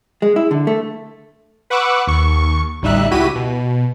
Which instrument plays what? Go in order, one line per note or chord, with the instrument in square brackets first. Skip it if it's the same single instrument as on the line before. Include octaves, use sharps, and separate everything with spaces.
[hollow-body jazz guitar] G#3
E4
D3
A3
[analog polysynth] B4 F#5 C#6 D6 E6 F#6
D#2 C#6
A1 D2 G3 D#4 E5 F#6
C#2 E4 F#4 G4 B6 D#7
B2